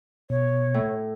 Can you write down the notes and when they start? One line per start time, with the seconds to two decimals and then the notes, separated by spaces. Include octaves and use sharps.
0.30 B2 C#5
0.74 A2